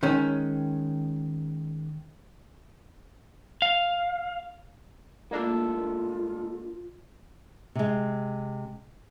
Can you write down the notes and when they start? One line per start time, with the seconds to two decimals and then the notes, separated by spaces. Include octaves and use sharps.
0.03 D#3 G#3 C#4
3.62 F5
5.31 A2 G#3 A#3 D4 F4 A4
7.75 C3 G#3